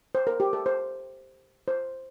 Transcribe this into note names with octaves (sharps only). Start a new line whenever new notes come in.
C5
A#4
G4
A4
C5
C5